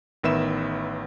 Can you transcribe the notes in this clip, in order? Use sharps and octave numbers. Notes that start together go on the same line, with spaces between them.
A1 D#3 B3 B4 E5 E7